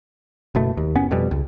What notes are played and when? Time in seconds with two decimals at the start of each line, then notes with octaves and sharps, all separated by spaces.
0.55 F#1 B2 A3
0.77 D#2
0.95 F#1 B3 C#4
1.11 F2 B2 G3
1.31 C#2